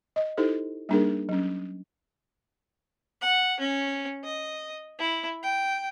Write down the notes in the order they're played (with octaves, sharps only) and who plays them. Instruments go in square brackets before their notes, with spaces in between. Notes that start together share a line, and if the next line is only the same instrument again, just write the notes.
[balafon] D#5
D#4 E4 G4 A4 C5
G3 A#3 D4 D#4 G#4 A#4
F#3 C#4
[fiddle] F#5
C#4
D#5
E4
G5